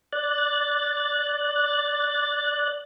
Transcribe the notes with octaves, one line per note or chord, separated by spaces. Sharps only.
D5 F#6 A6